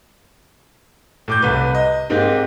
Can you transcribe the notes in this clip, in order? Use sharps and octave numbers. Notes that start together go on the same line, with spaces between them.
A2 D6 G6
C2 B4
D#5
G#2 A#3 C4 D#4 G4